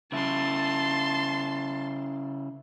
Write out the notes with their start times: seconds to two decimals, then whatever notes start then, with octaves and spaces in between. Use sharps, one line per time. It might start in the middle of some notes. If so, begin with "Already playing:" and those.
0.12 C#3 E4 A5 C6